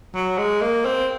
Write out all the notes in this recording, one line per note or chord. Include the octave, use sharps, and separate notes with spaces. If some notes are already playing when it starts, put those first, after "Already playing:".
F#3
G#3
A#3
C4